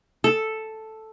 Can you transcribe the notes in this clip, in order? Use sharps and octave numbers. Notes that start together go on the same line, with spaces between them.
A4